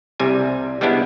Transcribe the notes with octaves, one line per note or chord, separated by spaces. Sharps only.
C2 C3 G3 G#5
G3 G#3 B3 D4 E4